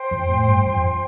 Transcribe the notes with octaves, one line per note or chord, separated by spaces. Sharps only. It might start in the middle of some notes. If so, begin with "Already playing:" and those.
Already playing: C5 G5 C6
F2
A2
G2
F2